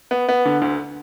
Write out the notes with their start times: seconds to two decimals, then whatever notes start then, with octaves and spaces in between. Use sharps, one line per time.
0.11 B3
0.28 B3
0.45 D3
0.62 D2